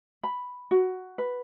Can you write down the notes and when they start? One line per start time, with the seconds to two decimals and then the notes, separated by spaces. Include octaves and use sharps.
0.23 B5
0.71 F#4
1.18 B4